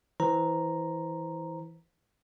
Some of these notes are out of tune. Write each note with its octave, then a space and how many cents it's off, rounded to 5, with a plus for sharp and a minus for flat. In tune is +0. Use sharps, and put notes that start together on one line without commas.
E3 -15 C5 +0 A#5 +0